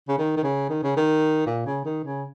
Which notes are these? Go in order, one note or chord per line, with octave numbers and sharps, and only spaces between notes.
C#3
D#3
D#3
C#3
D#3
C#3
D#3
A#2
C#3
D#3
C#3